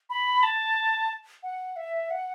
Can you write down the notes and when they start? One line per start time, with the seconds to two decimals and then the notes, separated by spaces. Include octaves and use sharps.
0.10 B5
0.43 A5
1.43 F#5
1.76 E5
2.10 F#5